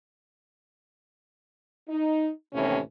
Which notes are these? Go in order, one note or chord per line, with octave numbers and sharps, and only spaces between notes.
D#4
D#2 A2 C3 E3 C#4